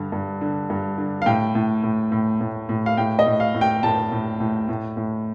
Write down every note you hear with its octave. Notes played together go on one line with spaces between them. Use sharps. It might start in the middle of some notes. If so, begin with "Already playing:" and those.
Already playing: G2 D3
G2
D3
G2
D3
F5
A2 G5
A2
A2
A2
A2
A2
F5
A2 G5
D#5
A2
F5
A2
G5
A2 A5
A2
A2
A2
A2